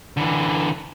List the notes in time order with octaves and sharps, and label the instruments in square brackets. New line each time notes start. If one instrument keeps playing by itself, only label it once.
[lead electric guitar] D3 E3